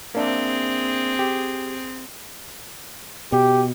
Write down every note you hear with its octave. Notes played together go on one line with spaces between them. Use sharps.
A#3 C4 D4 G#4 E5
G4
B2 G4